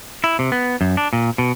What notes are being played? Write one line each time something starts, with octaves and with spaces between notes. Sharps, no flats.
E4
C3
B3
F#2
D4
A#2
B2